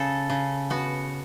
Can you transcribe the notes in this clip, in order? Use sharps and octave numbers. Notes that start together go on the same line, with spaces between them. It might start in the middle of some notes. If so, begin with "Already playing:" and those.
Already playing: C#3 A4
C#3
B3 F#4